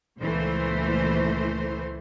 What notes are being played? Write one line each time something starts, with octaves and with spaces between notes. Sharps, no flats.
C#2 A#2 E3 A3 C5